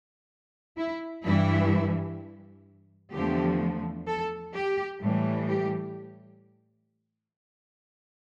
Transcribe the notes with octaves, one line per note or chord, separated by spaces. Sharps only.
E4
G2 E3 G3 E4
E2 D3 F3 A3 G4
A4
G4
A2 E3 G3
G4